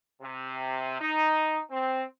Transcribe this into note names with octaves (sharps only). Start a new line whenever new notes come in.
C3
D#4
C4